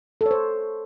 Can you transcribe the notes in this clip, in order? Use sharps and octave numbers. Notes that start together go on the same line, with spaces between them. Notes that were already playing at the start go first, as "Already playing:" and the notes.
A4
C#5
C5